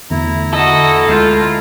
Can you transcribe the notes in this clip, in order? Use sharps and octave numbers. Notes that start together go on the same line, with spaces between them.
E2 D3 A3 E4 A#5
F#4 A4 D#5
D2 G#3 F4 G6